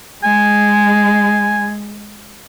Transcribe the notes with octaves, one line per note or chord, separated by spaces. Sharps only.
G#3 G#5